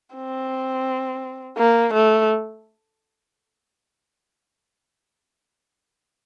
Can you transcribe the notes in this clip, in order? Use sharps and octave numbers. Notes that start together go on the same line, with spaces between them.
C4
A#3
A3